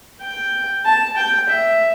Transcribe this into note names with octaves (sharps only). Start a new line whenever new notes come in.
G5
A5
G5
E5